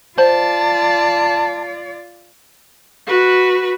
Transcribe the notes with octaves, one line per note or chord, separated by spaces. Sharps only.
F4 C5 D5 A5
F#4 B4